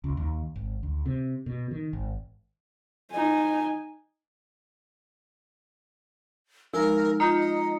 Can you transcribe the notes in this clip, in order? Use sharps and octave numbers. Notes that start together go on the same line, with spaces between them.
C#2
D#2
G#1
D2
C3
B2
D#3
G#1
D#4 G#5
F3 G#3 D#4 A#4
D#4 F4 D#5 A#5 D#6 G6 C#7